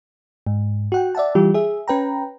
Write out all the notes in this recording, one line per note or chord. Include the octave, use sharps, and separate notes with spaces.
G#2
F#4 F#5 G5
D5 E5 F#5 A5
E3 G3 F4 G4
G#4 E5
C#4 B4 G5 A#5